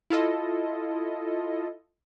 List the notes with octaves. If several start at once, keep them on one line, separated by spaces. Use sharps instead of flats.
E4 F4 A4 D#5